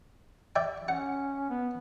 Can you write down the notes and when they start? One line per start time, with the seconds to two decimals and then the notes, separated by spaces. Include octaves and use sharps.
0.56 D5 E5 G5
0.88 C#4 F#5
1.49 B3